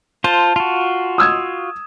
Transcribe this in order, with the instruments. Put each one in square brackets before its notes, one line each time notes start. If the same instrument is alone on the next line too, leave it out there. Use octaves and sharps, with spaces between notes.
[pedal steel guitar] F4 C5 [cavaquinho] A5
[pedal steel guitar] F4 F#4
[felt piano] D#6 E6 G#6